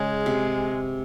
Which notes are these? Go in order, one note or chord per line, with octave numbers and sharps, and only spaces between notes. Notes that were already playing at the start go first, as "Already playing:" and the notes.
Already playing: C#3 G#3
C3